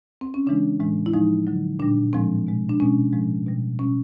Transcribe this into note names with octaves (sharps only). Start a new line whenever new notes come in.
C4
C#4
C#3 E3 G#3 D4
A2 E3 G#3
E4
A2 F3 G#3 D#4
D3 F#3
A#2 G3 D4
A2 F3 G#3 C4
B2 G#3
D4
B2 G#3 C#4
A2 F3 G#3
B2 G3
B2 G3 C#4